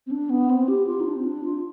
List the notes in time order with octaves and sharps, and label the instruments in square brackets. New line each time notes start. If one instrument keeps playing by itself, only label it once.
[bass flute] C4
D4
B3
C4
G4
F4
D#4
D4
C4
D4
F4